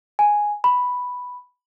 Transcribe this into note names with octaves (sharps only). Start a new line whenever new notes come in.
G#5
B5